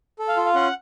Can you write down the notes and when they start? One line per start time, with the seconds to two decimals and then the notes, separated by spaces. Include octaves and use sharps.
0.19 A4
0.28 F5
0.37 F4
0.46 F5
0.55 C#4 F#5